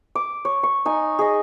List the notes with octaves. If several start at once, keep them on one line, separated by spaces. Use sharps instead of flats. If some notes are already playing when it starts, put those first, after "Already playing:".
D6
C#5
C#6
D#4 G#5
G#4 D#5